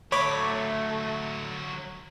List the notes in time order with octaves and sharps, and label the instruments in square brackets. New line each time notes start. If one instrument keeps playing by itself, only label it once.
[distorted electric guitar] D3 F#3 [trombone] A3 [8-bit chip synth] C#5 B5 D6